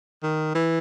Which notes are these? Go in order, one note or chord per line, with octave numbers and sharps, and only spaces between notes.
D#3
E3